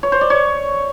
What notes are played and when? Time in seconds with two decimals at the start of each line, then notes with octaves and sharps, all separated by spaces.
0.03 C#5
0.12 C5
0.21 D5
0.30 C#5